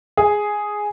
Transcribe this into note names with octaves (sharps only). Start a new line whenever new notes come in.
G#4